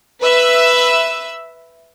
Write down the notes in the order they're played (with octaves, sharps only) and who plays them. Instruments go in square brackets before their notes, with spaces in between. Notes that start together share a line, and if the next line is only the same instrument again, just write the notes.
[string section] B4 E5 E6